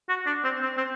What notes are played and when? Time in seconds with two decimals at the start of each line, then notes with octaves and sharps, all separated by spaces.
0.09 F#4
0.27 D4
0.44 C4
0.62 C4
0.77 C4